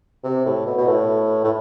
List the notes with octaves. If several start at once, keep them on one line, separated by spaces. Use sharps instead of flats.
C3
A2
B2
B2
A2
A2